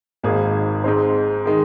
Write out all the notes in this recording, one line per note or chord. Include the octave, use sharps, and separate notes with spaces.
G#1 G#2 D#3 A#3 G#4
G#2 G#3 C4 D#4 C5
D#3 G#3 D#4